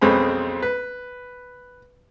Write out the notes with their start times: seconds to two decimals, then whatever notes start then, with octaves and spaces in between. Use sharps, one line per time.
0.02 B1 F2 G#3 C4 C#4 B5
0.62 B4